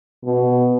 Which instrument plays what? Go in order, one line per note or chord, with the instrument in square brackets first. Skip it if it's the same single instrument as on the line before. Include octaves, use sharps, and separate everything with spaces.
[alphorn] B2